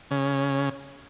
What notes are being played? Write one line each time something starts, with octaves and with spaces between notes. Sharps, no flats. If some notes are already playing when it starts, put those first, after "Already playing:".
C#3